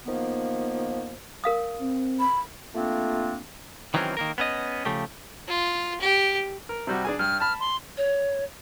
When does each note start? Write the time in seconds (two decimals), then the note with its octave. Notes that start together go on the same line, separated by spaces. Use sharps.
0.06 D#3 F3 A#3 B3
1.44 A#4 F5 D#6
1.81 C4
2.20 B5
2.74 A3 A#3 C4 D4 F4
3.94 D#3 E3 F#3 C4 C#4 A#4
4.17 D#3 A#3 A#4
4.38 B3 C#4 D#5
4.85 C#3 F3 A3 G4
5.48 F4
6.00 G4
6.69 A#4
6.87 C3 G3 F#4
7.05 D4 G#4 G#5
7.19 G2 F6
7.40 A5 B5 F6
7.60 C6
7.97 C#5